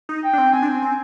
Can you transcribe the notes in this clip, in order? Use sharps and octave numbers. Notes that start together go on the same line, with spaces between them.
D#4
G5
D4
C4
C4 G#5
D4
C4
C4